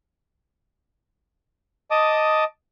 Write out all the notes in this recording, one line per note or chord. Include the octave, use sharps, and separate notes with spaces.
D#5 A5 D6 D#6